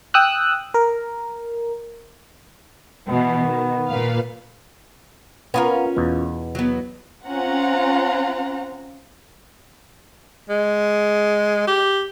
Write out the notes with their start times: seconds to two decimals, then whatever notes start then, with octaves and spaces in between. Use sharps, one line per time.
0.14 G5 D#6 E6 F#6
0.74 A#4
3.09 B2 E3 B3
3.45 D#3
3.87 A#2 B4 F5
5.54 B3 C#4 F4 A#4
5.96 E2 B2
6.55 F#3 B3
7.28 C4 C#4 F4 C5 F#5 A#5
10.50 G#3
11.67 G4